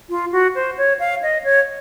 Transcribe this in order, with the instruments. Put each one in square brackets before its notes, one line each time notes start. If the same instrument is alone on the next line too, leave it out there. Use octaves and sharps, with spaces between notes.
[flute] F4
F#4
C5
C#5
F5
D#5
C#5